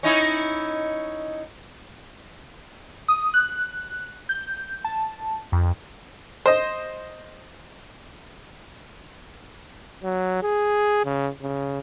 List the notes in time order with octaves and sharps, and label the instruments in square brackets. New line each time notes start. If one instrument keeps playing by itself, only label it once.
[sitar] C#4 D#4 E4
[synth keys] D#6
F#6
G6
A5
F2
[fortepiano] C5 D#5
[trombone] F#3
G#4
C#3
C#3